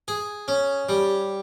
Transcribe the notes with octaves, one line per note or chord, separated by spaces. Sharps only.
G#4
C#4
G3